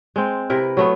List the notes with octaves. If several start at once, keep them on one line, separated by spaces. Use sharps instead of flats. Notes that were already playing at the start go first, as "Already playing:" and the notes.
G#3 C4
C3 E4 A#4 B4
F#3 A3 B3